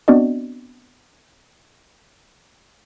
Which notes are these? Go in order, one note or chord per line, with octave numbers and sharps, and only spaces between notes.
B3 C4 D4 F#4 D5 D#5